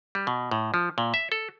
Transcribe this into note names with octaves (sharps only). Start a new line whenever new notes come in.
G3
B2
A2
F3
A#2
E5
A4